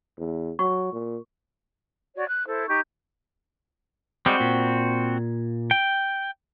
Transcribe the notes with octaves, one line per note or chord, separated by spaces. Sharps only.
E2
F#3 C#6
A#2
F#4 C#5 D5
F#6
E4 A4 C5
D#4 G4 C#6 G6
G3 G#3 C4 F#4
A#2
G5